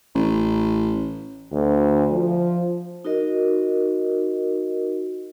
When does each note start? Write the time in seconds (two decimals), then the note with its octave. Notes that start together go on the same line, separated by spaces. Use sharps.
0.15 A1
1.52 D2
2.11 F3
3.05 D#4 F#4 A#4 D#5